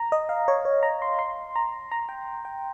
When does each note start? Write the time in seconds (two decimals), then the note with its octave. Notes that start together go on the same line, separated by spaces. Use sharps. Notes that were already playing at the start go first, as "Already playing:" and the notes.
Already playing: A#5
0.12 D#5
0.29 F5
0.48 C#5
0.65 C#5
0.83 A#5
1.02 C6
1.19 C6
1.56 A#5
1.92 A#5
2.09 G5
2.45 G5